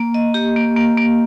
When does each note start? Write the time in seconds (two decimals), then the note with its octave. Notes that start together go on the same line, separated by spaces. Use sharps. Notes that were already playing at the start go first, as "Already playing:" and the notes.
Already playing: A#3
0.14 D#5
0.34 G4
0.56 A#3
0.77 A#3
0.97 A#3